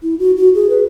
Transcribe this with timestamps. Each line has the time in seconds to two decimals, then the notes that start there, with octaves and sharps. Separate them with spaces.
0.03 E4
0.19 F#4
0.37 F#4
0.55 G#4
0.70 B4